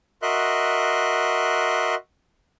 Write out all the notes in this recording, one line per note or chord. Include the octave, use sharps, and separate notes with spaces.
F#4 A#4 D#5 E5 C6 F#6